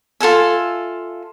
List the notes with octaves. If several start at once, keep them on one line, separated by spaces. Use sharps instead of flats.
F4 A4 E5 G#5